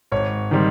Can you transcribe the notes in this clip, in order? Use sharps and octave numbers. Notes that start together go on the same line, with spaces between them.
G#1 C#5
D#3 G3 C4